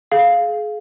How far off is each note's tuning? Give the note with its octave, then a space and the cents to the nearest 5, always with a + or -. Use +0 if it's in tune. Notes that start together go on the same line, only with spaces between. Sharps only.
G#4 +30 F5 +0